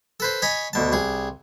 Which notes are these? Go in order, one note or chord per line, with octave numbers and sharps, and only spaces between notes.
A4 B4 C5
C#5 D#5 G#5 B5
D2 B2 A5
C2 G#4